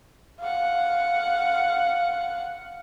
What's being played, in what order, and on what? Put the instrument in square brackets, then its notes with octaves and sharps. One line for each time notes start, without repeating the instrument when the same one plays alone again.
[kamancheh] F5 F#5